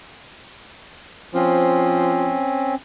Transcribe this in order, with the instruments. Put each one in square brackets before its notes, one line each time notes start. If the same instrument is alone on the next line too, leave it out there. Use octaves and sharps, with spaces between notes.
[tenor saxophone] F3 [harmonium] C4 C#4